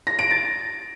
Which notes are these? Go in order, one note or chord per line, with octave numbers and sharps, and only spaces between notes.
A#6
D7
A6